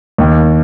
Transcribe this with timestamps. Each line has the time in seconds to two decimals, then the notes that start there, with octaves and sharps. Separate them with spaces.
0.18 D#2